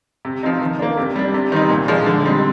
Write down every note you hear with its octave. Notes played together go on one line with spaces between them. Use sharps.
C3
F3 C4 D#4
D#3
A#3 D4
C3
G3 D4
C3
D#3 G3 C4 D#4
A#2
F3 G#3 D4
D3
G3 C4 D#4